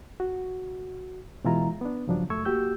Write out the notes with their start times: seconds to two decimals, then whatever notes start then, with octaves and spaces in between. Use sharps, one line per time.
0.20 F#4
1.44 B2 E3 G#3 E4 F4 A#5
1.81 B3 D4
2.07 G2 C#3 F3 F#3 D4
2.30 F#2 A3 C#6 E6 G#6
2.45 A#3 F#4 G4 E6 G6